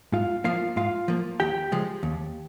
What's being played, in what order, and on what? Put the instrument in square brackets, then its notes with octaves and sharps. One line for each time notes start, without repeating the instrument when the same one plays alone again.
[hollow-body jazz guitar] G#2 F4 F5
F3 A#3 F4 F5
G#2 F4 F5
F3 A#3
D#2 G4 G5
C#3 F3 G#3
D#2